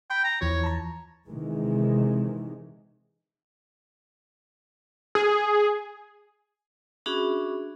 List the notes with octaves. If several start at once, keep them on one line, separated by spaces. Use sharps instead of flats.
G5 B5
A#5
E2 E3 F3 C#5
A5 A#5
C3 D#3 E3 G#3
G#4
C#4 D4 F#4 G#4 E5 B5